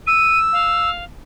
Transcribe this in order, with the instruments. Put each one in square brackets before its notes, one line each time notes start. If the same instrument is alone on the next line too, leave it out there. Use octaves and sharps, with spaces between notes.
[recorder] E6 [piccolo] D#7
[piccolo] F5